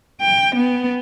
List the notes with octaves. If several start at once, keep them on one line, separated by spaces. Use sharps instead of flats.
G5
B3